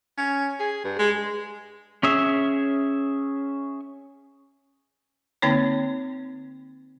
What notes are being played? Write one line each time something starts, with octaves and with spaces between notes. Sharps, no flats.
C#4
G#4
G2
G#3
C#4 G#4 E5
D3 A#3 C4 D#4 C#5